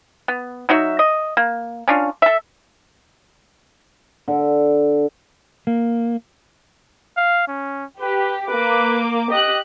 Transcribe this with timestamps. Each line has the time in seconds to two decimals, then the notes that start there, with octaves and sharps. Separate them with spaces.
0.28 B3
0.69 F#3 D#4 F#4 E5
0.99 D#5
1.37 A#3
1.88 C#4 D4 F4
2.22 A4 E5
4.28 D3
5.67 A#3
7.17 F5
7.48 C#4
8.00 G4 B4
8.48 A#3 B4 D6
9.31 G4 D#5 F#6